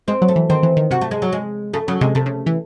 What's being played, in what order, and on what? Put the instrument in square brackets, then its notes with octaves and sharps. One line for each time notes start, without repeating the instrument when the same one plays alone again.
[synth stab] G#3 [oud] C4
[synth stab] F#3
[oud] A3
[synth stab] E3
[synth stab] D#3 [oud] C4
[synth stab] E3
D#3
[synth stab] C3 [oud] F#4
[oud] A3
G#3
F#3
G#3
[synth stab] C#3 [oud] A3
[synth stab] C#3 [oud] F#3
[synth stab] C3 [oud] G#3
[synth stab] C3 [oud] A3
[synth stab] C#3
E3